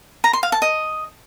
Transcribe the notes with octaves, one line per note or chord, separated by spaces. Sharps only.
A#5
C6
F5
A5
D#5